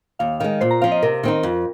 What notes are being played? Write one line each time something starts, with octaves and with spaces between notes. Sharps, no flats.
D#2 F5
D#3 G#3 F5
A#2 C5
A#5
F3 C4 F5
D#5
C3 A#4
D#3 C4 D#4
F2